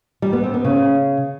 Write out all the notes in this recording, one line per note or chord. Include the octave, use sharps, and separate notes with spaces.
G3
B3
C4
B3
C#3